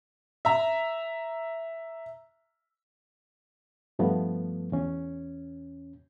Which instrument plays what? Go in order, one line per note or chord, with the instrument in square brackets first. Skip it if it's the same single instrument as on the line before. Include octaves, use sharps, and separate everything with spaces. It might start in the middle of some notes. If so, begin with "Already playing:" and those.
[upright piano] E5 A#5
[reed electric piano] G2 F3 A3 B3
E2 C#4